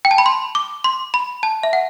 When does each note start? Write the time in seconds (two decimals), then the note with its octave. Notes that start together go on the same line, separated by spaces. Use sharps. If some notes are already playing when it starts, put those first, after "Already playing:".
0.05 G5
0.11 A5
0.18 B5
0.26 C6
0.55 D6
0.84 C6
1.14 B5
1.43 A5
1.63 E5
1.73 F#5